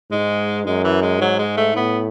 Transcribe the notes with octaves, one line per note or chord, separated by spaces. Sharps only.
G#2 G#3
F#2 G#3
E3
G#3
G#2 F#3
G#3
A3
A2 B3